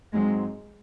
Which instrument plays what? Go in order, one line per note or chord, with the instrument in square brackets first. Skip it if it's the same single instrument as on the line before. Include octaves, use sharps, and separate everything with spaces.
[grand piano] G#2 F#3 C4 [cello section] G#3